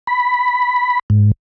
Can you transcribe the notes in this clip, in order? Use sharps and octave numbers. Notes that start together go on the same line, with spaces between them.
B5
G#2